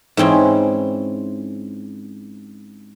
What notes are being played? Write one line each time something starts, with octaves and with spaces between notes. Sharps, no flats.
G#2 E3 C4 C#4